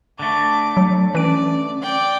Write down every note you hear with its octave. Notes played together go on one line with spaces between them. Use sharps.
D3 A3 D6
F#3
E3 C#4 D5 D7
D5 G5